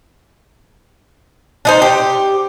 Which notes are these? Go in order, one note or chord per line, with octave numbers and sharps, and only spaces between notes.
D4 D#4 C5
G4